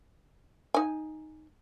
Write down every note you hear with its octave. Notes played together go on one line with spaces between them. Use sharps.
D#4 G#5